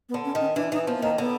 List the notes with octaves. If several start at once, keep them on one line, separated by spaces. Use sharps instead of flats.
B3
D3
C#4
D#3
C#4
E3 D4
E3 D#4
F3 B3
B3
D#3 A#3
D3 B3